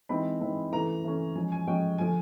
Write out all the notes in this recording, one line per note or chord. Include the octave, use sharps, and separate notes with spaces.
E3 G#3 C4 D#4 B5
E3 G#3 C4 D#4
E3 A3 C#4 A#5
E3 A3 C#4
F3 G#3 C#4 G#5
G#5
F3 G#3 C#4 G5
D3 F3 A3 G#5